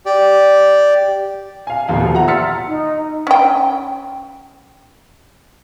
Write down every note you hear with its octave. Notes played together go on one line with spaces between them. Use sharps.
G4 D5
F5 G#5
D#1 A1 D#2 F5
B2 F3
E5 F#5 A#5
C6 E6 F6 A6 B6 C#7
D#4
C#4 G5